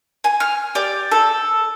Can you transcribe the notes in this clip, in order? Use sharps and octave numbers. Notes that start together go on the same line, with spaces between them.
G#5
F6
G4 D5
A4